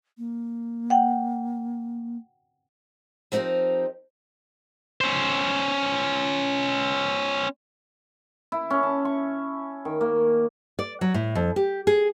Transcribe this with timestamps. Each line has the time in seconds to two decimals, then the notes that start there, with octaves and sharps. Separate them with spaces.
0.18 A#3
0.90 F#5 G5
3.32 F3 C4 D#4 G4 A#4
5.01 C#4 C5
8.52 E4
8.70 C#4
8.83 A5
9.05 C#6
9.85 D#3
10.01 A#3
10.79 D5
11.01 F#3
11.14 A2
11.35 F2
11.56 G4
11.87 G#4